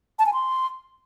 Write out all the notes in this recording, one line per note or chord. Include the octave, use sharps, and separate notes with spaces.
A5
G#5
C6